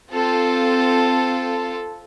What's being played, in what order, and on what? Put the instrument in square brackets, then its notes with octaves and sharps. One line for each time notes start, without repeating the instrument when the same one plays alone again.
[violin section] C4 F4 A4